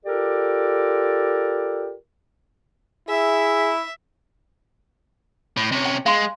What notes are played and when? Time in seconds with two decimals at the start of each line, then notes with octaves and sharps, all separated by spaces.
0.05 F4 G4 A4 A#4 D5
3.09 E4 G#4 E5
5.57 A2
5.72 C3 C#4
5.86 G5
6.06 G#3 F5 C6